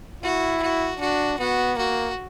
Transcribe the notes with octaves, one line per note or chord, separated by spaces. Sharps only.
E4 F#4
F#4
D4 F#4
B3 F#4
A#3 F#4